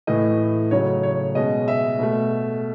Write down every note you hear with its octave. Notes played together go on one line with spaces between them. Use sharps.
A2 E3 A3 D#5
C#3 F#3 A3 C#5
C#5
B2 G#3 D#5
E5
B2 A3